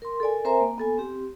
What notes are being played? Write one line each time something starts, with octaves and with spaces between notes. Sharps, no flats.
A#4 C6
A4 A#4 D5 G#5
C4 A#4 C5 E5 G#5 A#5
A#3
B3 A4 G#5
C4 G4